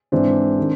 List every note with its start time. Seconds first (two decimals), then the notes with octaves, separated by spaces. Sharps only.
0.12 G#2 E3 C4 D4
0.59 D#3